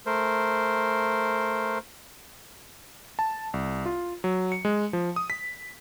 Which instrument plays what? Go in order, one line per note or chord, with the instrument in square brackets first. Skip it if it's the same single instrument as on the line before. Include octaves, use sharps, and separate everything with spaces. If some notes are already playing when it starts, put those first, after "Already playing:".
[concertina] A3 A#4 C5
[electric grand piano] A5
C2
F4
F#3
C#7
G#3
F3
D#6
B6